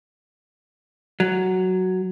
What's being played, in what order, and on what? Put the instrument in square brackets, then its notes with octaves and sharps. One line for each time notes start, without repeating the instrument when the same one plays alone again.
[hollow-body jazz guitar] F#3